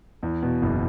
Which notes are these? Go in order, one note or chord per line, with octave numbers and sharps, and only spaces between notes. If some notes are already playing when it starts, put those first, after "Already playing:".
E2
B2
F#1